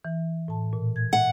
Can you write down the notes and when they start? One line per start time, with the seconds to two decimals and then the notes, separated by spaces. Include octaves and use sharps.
0.05 E3
0.48 A2 A5
0.73 A#2
0.96 G#6
1.13 F#5